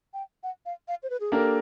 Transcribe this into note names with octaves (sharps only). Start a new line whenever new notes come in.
G5
F#5
F5
F5
C5
B4
G#4
A#3 D4 G4 A4 A#4